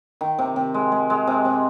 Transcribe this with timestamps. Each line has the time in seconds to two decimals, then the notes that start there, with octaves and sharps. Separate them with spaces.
0.21 D#3
0.39 C3
0.56 C3
0.74 G#3
0.92 G#3
1.10 G#3
1.27 C3
1.45 C3